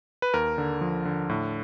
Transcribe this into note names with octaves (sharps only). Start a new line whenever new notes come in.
B4
D#2 A#4
D3
F3
D3
A2